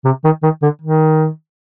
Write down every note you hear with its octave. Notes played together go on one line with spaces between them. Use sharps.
C3
D#3
D#3
D3
D#3